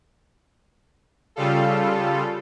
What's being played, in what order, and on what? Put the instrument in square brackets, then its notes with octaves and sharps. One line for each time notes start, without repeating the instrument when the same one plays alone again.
[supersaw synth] C#3 G3 F4 A4